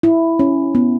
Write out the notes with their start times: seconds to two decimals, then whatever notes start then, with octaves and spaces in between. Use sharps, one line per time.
0.03 E4
0.39 C#4
0.75 B3